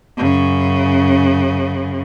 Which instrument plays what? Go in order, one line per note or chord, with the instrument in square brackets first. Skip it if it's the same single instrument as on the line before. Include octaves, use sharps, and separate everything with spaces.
[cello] F#2 C#3